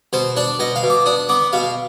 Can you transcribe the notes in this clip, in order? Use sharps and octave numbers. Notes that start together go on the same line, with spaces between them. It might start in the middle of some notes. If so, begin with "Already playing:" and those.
B2 C5
D4 D5
B2 D#5
F5
B2
D6
D4 D#6
B3 D6
B2 F5